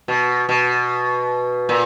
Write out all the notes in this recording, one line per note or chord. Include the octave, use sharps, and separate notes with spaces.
B2
B2
A#2